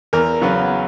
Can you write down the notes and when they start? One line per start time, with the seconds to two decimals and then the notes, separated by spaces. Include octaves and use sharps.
0.13 E2 A#4
0.41 C#3 F#3 B3